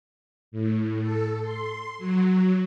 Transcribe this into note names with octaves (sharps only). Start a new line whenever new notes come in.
A2
A4
C6
F#3